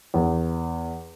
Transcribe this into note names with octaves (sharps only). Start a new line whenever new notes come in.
E2